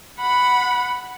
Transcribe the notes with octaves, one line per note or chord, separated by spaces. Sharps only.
F#5 B5